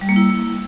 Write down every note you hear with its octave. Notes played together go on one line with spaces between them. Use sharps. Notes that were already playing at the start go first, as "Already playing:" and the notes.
G3
A#3
E4